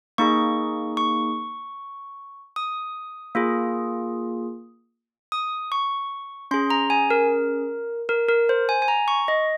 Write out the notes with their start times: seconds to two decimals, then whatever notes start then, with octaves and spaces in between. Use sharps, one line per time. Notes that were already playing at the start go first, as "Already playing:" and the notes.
0.18 A#3 D#4 G#4 C#6
0.97 C#6
2.56 D#6
3.35 A#3 F4 G#4
5.32 D#6
5.72 C#6
6.51 C#4 G#4 C6
6.70 A#5
6.90 G#5
7.10 A#4
8.09 A#4
8.29 A#4
8.49 C5
8.69 G#5
8.82 G#5
8.88 A#5
9.08 C#6
9.28 D#5